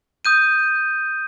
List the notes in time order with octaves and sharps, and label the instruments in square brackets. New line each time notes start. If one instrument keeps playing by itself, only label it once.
[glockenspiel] D#6 G6 D#7